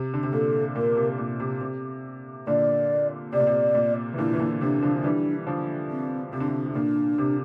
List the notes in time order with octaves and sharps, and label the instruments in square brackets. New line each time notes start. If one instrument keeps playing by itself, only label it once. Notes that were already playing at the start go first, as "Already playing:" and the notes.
Already playing: [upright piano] C3
D3
C3
[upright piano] A#2 [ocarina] A4
[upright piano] A#2 [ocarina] A#4
[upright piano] C3
A#2
C3
C3
[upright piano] A#2 D3 [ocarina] D5
[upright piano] C3 [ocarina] D5
[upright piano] A#2
C3
A#2
E3
[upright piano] A#2 D3 [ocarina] E4
[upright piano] E3
A#2 D3
[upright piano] C3 E3 [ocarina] D4
[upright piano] D3 F3
F3
[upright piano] E3 G3 [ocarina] D4
[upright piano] D3 F3
[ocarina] C4
[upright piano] C3 [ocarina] C4
[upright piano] D3
C3
C3
[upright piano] A#2 [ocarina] D4
[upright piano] C3